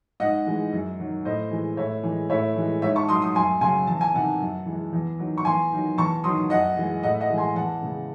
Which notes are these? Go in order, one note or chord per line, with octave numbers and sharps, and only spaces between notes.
G#2 D#5 F#5
E3 G#3
F#2
D#3 F#3
A2 C5 D#5
E3 G#3
A2 C#5 E5
E3
G#3
A2 C#5 E5
E3 G#3
G#2 C#5 E5
A5 C#6
F#3 C6 D#6
C6 D#6
F#2 G#5 C6
C#3 F#3 G#5 C6
E2 A5
G#5
C3 D#3 F#5 A5
F#2
E3 G#3
E2
D#3 F#3
C#6
E2 G#5 C6
D#3 F#3
E2 A5 C#6
D#3 F#3 C6 D#6
F#2 D#5 F#5
E3 G#3
A2 D#5 F#5
E5
D#5 F#5
E3 G#3
G#5 C6
E2 F#5 A5
C#3 G#3